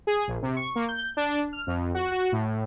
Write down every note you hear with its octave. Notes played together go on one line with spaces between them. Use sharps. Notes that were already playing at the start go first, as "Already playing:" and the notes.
G#4
A#1
C3
C#6
A#3
G6
D4
F6
F2
F#4
F#4
A2